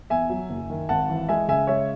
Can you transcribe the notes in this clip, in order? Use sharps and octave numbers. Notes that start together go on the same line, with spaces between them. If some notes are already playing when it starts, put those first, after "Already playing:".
E2 E5 G#5
F#3
F#1
D#3
G#1 F#5 A5
E3
G#3 E5 G#5
C#3 E5 G#5
G#3 C#5 E5